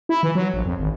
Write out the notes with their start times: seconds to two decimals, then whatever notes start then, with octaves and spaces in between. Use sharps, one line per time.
0.09 E4
0.23 E3
0.35 F#3
0.54 A#1
0.65 F2
0.79 G#1